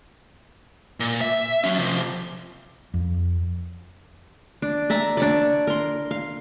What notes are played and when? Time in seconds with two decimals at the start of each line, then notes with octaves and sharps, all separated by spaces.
1.00 A#2
1.21 E5
1.64 F#3 C#4
1.78 C3 F3
2.94 F2
4.62 D4
4.90 D5 E5 A#5
5.17 D4 C#5 D5
5.67 A#4 C6
6.11 F5